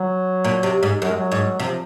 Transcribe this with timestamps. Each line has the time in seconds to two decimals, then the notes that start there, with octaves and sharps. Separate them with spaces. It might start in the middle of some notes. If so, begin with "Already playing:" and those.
Already playing: F#3
0.44 A#2
0.63 C3
0.83 G#2
1.01 F#2 F#3
1.10 G#3
1.17 F#3
1.32 G#2
1.59 C3 F3